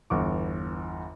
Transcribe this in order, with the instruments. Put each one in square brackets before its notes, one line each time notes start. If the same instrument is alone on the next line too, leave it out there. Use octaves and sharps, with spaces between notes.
[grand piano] G1 E2 C#6 D6